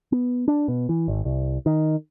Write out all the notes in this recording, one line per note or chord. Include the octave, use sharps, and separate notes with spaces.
B3
D4
B2
E3
G#1
C2
D#3